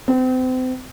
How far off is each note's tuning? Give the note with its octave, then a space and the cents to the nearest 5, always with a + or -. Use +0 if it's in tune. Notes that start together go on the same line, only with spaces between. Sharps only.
C4 -35